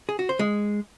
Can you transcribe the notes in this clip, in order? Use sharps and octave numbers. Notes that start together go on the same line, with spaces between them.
G#4
F#4
C5
G#3